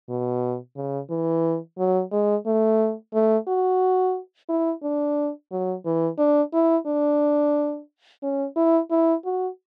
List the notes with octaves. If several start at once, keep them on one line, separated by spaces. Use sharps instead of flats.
B2
C#3
E3
F#3
G#3
A3
A3
F#4
E4
D4
F#3
E3
D4
E4
D4
C#4
E4
E4
F#4